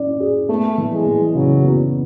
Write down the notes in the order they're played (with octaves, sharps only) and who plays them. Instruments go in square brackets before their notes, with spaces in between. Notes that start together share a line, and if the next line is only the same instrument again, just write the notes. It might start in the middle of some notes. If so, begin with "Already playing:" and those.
Already playing: [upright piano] C#4 D5
G#4
[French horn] A3 [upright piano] B3
[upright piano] E3
[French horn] G#3
[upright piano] E3
[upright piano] C#3 [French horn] F#3
[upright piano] B3